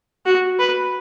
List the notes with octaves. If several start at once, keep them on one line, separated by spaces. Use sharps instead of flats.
F#4
B4